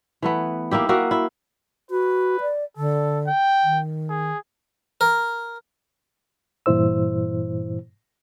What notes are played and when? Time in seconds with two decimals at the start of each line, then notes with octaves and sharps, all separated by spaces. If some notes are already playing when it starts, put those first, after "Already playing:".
0.22 E3 A3 B3
0.71 A#3 D#4 E4 G4
0.89 A#3 F#4 A#4 E5
1.11 E4
1.91 F#4 B4
2.41 D5
2.77 D3 A4
3.27 G5
3.64 D#3
4.09 G#4
5.01 A#4
6.66 G2 A#2 E3 E4 C5 E6